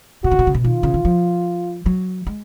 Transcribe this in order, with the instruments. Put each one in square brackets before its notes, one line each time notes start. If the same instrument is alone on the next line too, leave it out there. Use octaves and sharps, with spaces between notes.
[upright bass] B2 [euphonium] F#4
[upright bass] C#3
B2
C#3
B2
[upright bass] D#3 [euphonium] F4
[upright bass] C#3
D#3
F3
F#3
G#3